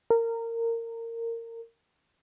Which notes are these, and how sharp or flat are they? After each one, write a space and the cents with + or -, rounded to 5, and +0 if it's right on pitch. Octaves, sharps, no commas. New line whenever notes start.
A#4 -20